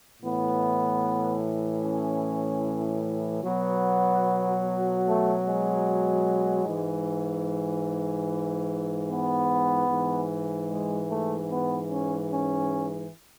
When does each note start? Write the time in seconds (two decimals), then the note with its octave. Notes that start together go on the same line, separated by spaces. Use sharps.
0.22 A2 E3 B3
1.83 C#4
3.44 B2 F#3 B3
5.05 A3
5.46 G#3
6.66 G#2 E3
9.07 B3
9.88 G#2 E3
10.68 G#3
11.09 A3
11.48 B3
11.89 C#4
12.30 C#4